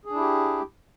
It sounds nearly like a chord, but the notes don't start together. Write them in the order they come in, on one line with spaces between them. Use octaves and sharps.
G#4 D4 E4 G4